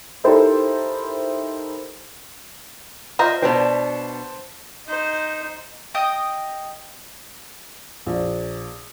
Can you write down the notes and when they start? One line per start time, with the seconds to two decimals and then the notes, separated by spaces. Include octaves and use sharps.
0.24 D#4 E4 G4 A4 A#4 C5
3.19 F4 C5 D#5 E5 A#5
3.42 B2 B3 D4 C5 A5
4.87 D#4 C5
5.95 D#5 G5 D#6
8.06 A#1